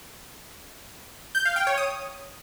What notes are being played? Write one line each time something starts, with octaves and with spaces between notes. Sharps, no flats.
G6
F5
G5
C#5
D#6